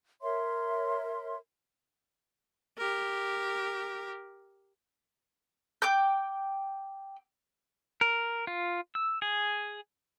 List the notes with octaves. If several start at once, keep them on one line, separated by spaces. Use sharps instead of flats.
A#4 C#5 E5 C6
G4 A#4
G5 D6 G6
A#4
F4
E6
G#4